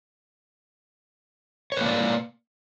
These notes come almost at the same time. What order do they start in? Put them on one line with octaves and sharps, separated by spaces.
C#5 B4 A#3 D5